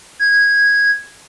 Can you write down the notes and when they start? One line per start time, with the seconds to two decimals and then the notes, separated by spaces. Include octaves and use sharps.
0.19 G#6